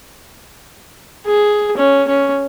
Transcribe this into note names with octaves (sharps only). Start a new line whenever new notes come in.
G#4
C#4
C#4